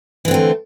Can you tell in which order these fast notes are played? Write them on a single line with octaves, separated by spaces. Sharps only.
E3 D3 C4 A3